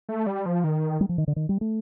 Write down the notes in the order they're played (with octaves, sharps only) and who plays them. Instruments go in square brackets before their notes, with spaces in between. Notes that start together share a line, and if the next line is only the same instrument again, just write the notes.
[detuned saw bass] A3
G3
F3
D#3
[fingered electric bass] G3
F3
D#3
D3
D#3
G3
A3